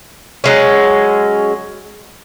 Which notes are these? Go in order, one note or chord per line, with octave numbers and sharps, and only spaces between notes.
F#3 G#3 C#4